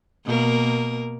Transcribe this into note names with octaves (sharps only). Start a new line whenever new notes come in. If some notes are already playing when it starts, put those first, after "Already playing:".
B2 A#3 A#4